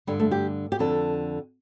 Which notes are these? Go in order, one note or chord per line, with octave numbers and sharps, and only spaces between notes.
G2 D3 G3
A3
G4
G4
F2 D3 A4